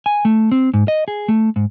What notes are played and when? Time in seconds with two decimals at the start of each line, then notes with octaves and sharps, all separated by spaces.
0.06 G#5
0.25 A3
0.52 C4
0.74 G#2
0.88 D#5
1.08 G#4
1.28 A3
1.56 G#2